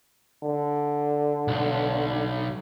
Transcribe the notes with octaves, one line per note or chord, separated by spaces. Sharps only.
D3
B1